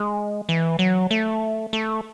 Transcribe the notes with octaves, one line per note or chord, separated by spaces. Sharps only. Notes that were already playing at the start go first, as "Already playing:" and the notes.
Already playing: G#3
E3
F#3
A3
A3